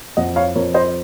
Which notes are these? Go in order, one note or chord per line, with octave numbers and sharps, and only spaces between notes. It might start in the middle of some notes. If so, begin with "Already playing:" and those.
F2 D#5 F#5
C#5 F5
F2 A#4 C#5
C5 D#5